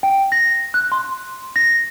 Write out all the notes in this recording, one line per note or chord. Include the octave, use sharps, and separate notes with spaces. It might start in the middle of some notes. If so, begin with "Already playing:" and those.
G5
A#6
F#6
C6
A#6